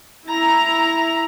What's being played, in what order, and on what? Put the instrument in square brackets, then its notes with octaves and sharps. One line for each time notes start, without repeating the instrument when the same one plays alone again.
[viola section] E4 A#5